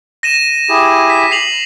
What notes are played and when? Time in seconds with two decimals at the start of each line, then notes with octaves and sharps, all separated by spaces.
0.23 A#6 D#7 E7
0.69 E4 G4 G#4
1.10 B6
1.31 C7 F7 F#7